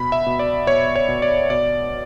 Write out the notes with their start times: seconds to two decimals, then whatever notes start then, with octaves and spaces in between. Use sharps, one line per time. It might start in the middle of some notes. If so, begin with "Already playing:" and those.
Already playing: B2 B5
0.12 E5
0.26 B2
0.39 D5
0.67 B2 C#5
0.96 C#5
1.09 B2
1.22 D5
1.50 B2 D5